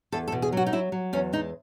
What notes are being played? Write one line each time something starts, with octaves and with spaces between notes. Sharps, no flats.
E2 A4
A4
B2
G#4
F#3 F#4
D#4
F#3 E4
F#3
E2 C#4
G#3 D#4